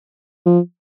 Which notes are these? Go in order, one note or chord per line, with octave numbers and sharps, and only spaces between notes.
F3